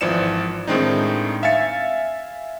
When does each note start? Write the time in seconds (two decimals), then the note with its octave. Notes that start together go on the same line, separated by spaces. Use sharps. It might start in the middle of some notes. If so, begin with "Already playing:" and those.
0.01 G#1 E3 F3 D5 C#7 E7
0.67 A2 D#3 G#3 C4 D4 D#4
1.43 E5 F5 G#5 A6 C#7